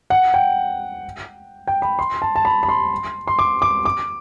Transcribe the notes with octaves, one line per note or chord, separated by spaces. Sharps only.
F#5
G5
G5
B5
C6
A5
A5
B5
B5
C6
C6
D6
D6
D6